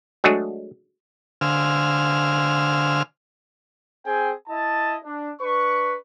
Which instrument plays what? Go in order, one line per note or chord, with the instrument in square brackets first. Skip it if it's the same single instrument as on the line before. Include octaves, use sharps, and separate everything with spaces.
[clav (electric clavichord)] F#3 G#3 A3 D4 F#4 G#4
[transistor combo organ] D3 C5 F5 G#5 E6 F6
[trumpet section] C4 G#4 G5 G#5
E4 D#5 A5
D4
D4 B4 C#6